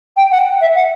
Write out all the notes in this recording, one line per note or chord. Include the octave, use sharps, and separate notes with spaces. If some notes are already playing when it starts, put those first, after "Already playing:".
G5
F#5
E5
F#5